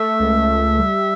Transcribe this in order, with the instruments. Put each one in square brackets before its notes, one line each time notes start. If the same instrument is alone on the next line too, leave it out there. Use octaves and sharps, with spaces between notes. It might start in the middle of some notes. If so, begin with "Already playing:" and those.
Already playing: [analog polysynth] A3 [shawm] E5
[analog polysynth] C#2
C#2
G3